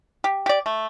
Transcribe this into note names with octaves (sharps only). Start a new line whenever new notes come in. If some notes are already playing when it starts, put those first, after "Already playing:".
G4
G4 D5
A3